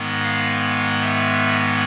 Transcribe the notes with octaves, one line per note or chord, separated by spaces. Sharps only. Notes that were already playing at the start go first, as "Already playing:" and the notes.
Already playing: G#2 D#3 G#3 B3
F5
E5